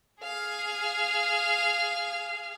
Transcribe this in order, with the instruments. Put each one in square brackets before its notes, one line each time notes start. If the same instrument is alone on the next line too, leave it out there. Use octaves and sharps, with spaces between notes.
[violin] G#4 F5